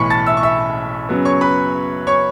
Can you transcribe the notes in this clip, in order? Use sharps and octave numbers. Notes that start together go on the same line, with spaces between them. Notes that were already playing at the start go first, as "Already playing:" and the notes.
Already playing: B1 A2 E3 B5 C#6 C#7
A5 A6
E5 E6
C#6
E5 E6
F#2 C#3 F#3 B3
C#5 C#6
B4 B5
C#5 C#6